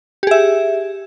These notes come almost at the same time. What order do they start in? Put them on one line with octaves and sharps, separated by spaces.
G4 G#4 E5